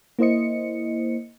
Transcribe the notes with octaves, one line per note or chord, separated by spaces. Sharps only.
A#3 E4 C5 D#5 C#7